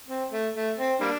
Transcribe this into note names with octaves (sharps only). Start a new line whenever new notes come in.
C4
A3
A3
C4
G3 A#3 D4